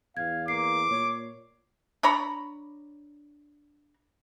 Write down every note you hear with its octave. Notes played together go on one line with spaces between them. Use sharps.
E2 F5 G#6
A#3 D6 C7
A#2 C#5
D4 C#5 A#5 B5